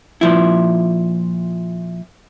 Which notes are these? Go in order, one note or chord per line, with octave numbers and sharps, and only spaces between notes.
A#2 F3 E4